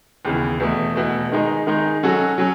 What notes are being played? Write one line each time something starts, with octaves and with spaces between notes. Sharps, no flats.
D#2 C#3 E3 B3
E2 B2 A3
E2 B2 A3
D#3 G#3 D#4
D#3 G#3 D#4
F#3 C#4 F#4 A4
F#3 C#4